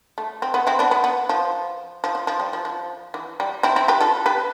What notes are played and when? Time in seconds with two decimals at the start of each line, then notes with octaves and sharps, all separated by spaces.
0.18 A3
0.42 C4
0.54 B3
0.67 C4 E4
0.79 B3 D4
0.91 B3
1.04 B3
1.29 F3
2.04 F3
2.15 F3
2.27 F3
2.40 G3
2.53 F3
2.65 F3
3.14 E3
3.40 G3
3.63 C4 E4
3.76 C4 E4
3.88 G4 B4
4.01 F4 A4
4.26 G4 B4